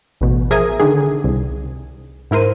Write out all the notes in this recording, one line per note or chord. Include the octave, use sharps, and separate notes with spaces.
A1 B2
F3 G#4 A#4 E5 D#6 G#6
D3 D#3 G#4
C2
G#2 E4 A#4 C5 D#7